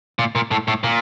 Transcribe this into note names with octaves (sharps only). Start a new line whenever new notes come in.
A#2
A#2
A2
A2
A#2